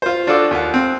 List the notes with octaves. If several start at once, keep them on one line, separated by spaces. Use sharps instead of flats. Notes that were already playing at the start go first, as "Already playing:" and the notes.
F4 C5
D4 F4 F#4 A4 D5
D#2 F4 F#5
C4